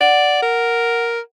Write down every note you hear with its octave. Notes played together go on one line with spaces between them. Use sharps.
D5 F#5
A#4